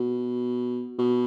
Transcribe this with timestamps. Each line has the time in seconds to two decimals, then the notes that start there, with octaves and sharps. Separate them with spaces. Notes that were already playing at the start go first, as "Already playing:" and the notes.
Already playing: B2
0.99 B2